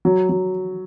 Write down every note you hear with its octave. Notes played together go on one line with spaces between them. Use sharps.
F#3
F#3